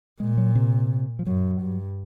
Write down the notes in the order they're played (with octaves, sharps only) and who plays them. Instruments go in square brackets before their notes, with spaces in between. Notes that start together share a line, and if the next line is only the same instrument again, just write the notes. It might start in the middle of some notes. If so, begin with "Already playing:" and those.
[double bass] A#2 [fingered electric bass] G#3
[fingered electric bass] F#3
C3
F3
[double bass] F#2 [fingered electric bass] F#3
[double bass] G2